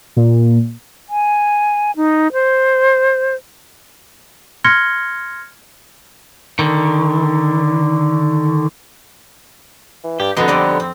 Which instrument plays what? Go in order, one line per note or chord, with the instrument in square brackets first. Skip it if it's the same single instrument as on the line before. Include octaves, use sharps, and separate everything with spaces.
[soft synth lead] A#2
[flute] G#5
D#4
C5
[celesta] C6 F6 G#6 A#6 C#7 G7
[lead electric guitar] D3 D#3
[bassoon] E3
[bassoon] G2 [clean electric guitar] G4
[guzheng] F2 C6 [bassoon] B2 [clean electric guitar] D3 B3 D#4
[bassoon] G3 [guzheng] C4 D5 D#5
[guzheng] C4